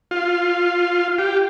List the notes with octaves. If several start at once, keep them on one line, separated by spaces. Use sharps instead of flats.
F4
G4